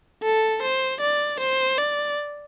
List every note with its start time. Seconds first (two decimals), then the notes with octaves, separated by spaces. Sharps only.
0.23 A4
0.62 C5
1.01 D5
1.40 C5
1.78 D5